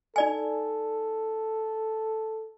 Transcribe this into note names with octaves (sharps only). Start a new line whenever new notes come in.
D#4 A4 D5 G#5